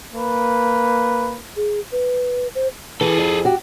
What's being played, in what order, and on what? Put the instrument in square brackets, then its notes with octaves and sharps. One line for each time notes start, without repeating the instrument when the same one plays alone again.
[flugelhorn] A#3 [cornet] B4
[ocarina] G#4
B4
C5
[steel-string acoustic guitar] E3 [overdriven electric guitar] G#4 A4
[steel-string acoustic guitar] F2
F#4 G4